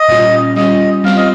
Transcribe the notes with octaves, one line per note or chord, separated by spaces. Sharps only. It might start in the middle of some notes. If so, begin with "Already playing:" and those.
Already playing: D#5
A#2 G3 C#4 F4
G3 C#4 F4 D#5
G3 C4 F4 F5
D#5